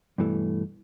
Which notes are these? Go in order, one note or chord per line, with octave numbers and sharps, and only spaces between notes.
G2 B2 E3 A3